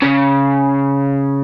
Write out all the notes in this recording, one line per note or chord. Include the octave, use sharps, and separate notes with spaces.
C#3